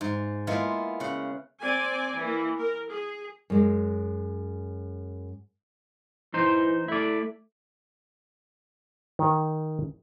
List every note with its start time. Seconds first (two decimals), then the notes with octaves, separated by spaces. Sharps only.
0.01 G#2
0.47 G#3 A#3 B3 E4 F4
1.00 C#3 F#5
1.60 C4 D5 G#5
2.19 E3 A#3
2.56 A#4
2.90 G#4
3.50 F#2 G#3
6.34 E3 D#4 C5
6.88 A3 E4 D5
9.19 D#3